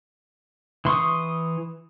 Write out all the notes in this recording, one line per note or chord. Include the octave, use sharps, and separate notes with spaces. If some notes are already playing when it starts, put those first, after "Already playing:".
E3 C6 C#6 D#6